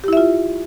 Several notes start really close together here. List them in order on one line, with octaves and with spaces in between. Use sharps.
G4 E4 E5 F4